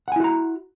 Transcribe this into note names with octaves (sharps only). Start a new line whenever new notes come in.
E4 F#4 F#5 G#5 A#5